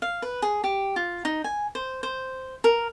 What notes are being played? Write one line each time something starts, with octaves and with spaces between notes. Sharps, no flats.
F5
B4
G#4
G4
F4
D#4
G#5
C5
C5
A#4